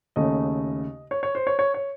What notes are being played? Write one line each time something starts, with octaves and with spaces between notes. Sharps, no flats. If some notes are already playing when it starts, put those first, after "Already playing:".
D#2 C#3 A3 D#5
C#5
C#5
C5
C#5
C#5
C#5